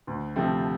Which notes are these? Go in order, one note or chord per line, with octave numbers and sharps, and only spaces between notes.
D2
C3 F3 A3 C4